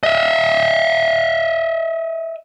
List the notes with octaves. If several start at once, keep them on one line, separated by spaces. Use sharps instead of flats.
D#5 E5